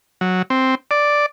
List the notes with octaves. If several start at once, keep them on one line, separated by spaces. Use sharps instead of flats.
F#3
C4
D5